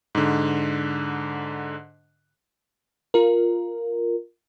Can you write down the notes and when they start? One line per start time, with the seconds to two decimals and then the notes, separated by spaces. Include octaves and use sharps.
0.15 G#2 D3
3.14 F4 A#4